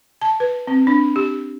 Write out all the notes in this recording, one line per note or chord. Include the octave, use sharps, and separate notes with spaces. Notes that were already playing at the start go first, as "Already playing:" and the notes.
A5
B4
C4
D4
G4